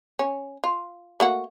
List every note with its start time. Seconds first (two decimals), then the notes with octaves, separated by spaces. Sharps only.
0.19 C#4
0.64 F4
1.20 A3 A#3 F#4